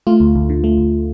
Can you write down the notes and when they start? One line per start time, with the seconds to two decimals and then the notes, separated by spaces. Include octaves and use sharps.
0.07 A3 F4
0.20 D2
0.36 D2
0.50 D3
0.64 A3
0.78 D2